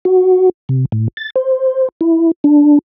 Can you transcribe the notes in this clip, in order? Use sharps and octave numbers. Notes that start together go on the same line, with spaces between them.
F#4
C3
A2
A6
C5
E4
D4